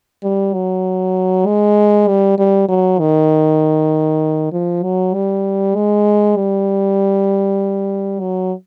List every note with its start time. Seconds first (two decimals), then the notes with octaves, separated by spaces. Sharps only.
0.24 G3
0.54 F#3
1.46 G#3
2.08 G3
2.38 G3
2.69 F#3
3.00 D#3
4.52 F3
4.83 F#3
5.14 G3
5.75 G#3
6.36 G3
8.20 F#3